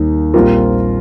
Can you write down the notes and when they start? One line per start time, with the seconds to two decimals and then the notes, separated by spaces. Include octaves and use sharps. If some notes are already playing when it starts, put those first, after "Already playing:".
Already playing: D#2 G3 A#3 D#4
0.34 A#1 A#2 G3 C4 F4 A#4